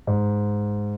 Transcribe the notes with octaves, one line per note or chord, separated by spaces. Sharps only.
G#2